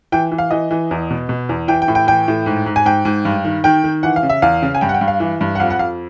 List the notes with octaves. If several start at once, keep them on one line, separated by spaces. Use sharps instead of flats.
E3 G5
E3
F5
E3 D#5
E3
E2
B2
B2
E2
E3 G5
G5
A2
G5
E3 G5
A2
G#2
G#2
G#5
G#2 G5
G#2
G2
D#3
D#3 G5
D#3
E3 F#5
F5
C#3
E5
E2 F5
C#3
G#5
G2 G5
F#5
G5
G2
F5
E3
G2
F#5
F2 F5
F#5
F2 F5